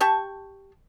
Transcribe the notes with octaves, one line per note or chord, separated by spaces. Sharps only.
G4 A5 C#6